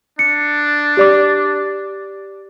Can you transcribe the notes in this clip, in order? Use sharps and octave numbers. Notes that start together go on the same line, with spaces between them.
D4 C#7
G4 D5 D6